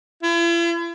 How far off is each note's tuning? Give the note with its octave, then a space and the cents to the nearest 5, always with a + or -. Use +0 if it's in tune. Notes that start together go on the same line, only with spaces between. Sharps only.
E4 +45